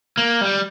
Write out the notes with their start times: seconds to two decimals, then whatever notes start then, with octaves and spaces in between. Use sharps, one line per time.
0.17 A#3
0.41 G3